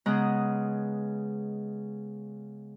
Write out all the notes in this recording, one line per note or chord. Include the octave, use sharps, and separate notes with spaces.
C#3 G#3 B3 D#5 A#5 F#6